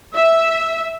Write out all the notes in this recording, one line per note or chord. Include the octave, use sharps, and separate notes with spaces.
E5